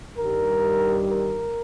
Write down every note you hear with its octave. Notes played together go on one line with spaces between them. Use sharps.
G2 D#3 G3 A#4
A#4